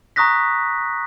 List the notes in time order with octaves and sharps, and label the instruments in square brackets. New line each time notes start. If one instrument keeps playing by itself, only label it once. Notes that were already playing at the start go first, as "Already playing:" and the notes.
[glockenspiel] A#5 C#6 D#6 F#6 A#6 B6